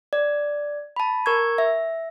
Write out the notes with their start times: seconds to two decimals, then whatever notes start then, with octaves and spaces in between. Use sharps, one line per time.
0.13 D5
0.96 A5 B5
1.26 A#4 C#6 G#6
1.58 E5